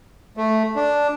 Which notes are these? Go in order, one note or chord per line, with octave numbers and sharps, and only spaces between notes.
A3
D4